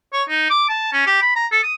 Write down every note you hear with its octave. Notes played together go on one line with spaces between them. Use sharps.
C#5
D#4
D6
A5
C#4
G4
B5
A#5
A4
D#6